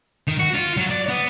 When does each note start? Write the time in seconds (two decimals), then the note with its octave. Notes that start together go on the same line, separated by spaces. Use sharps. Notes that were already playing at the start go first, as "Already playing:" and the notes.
0.28 D#3
0.39 F#4
0.54 F4
0.77 F#3
0.90 D5
1.08 B3